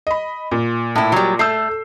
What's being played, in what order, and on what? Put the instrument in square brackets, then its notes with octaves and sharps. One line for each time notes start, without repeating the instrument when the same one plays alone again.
[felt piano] D#5 B5
A#2
[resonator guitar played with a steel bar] A2 E4
F#3 G3
[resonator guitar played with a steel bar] A3 [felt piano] E6 G6 C7